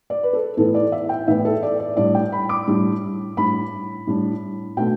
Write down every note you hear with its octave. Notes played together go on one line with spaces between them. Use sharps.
D5
B4
A4
A2 E3 B3 E4 A4
D5
E5
G5
A2 E3 B3 E4 E5
A4
D5
D5
A2 G3 D4 D5
G5
B5
D6
A2 G3 D4
A2 G3 D4 B5
A2 G3 D4
B2 A3 D4 G5